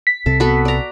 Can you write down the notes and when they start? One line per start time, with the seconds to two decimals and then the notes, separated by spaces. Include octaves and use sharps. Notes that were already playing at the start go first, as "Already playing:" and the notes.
0.07 B6
0.26 C2 C3 C4 A4
0.40 B3 F#4 A4
0.65 D5 A#5